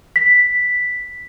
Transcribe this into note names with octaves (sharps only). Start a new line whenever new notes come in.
B6